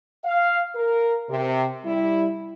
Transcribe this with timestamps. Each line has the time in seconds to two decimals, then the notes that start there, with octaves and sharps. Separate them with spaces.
0.24 F5
0.74 A#4
1.29 C3
1.84 G3 E4